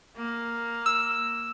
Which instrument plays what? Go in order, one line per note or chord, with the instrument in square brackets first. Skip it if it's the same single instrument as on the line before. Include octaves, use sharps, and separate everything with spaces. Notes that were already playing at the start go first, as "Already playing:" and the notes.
[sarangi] A#3
[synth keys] E6